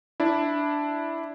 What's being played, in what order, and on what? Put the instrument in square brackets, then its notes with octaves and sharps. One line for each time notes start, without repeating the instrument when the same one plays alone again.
[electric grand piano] D4 E4